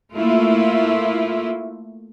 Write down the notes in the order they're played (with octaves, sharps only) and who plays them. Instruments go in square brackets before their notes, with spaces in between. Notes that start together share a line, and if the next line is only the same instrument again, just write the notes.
[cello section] A3 A#3 E4 F4